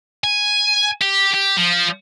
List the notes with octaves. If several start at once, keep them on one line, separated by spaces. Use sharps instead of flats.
G#5
G4
G4
F3